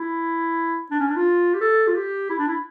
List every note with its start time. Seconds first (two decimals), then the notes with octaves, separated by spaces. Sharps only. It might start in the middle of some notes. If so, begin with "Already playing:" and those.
Already playing: E4
0.90 D4
1.00 C#4
1.08 D4
1.16 F4
1.54 G4
1.61 A4
1.87 F4
1.95 G4
2.30 E4
2.39 D4
2.47 E4